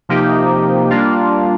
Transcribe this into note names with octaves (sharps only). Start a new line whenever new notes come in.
C3 F3 A#3 D#4 G4
G3 A#3 D4 F4